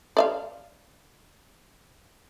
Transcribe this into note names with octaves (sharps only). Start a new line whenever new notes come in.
D5 E5 F5